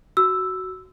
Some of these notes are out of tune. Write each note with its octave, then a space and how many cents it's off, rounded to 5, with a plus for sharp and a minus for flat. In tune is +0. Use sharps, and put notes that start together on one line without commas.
F#4 +10 E6 +0